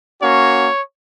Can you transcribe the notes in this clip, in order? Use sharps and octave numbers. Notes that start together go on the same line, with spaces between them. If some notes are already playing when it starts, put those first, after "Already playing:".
A#3 C#4 F#4 C#5